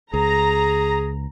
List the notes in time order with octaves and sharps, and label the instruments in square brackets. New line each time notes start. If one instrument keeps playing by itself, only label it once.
[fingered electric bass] C#2 [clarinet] G#4 [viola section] A#5